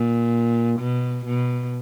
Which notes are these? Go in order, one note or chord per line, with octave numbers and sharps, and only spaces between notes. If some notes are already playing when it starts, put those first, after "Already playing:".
Already playing: A#2
B2
B2